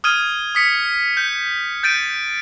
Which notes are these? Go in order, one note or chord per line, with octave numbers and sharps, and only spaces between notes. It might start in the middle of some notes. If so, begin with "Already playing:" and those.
D#6 F6 G#6 D#7
D#6 B6 C#7
G6
G6 A6 D7 D#7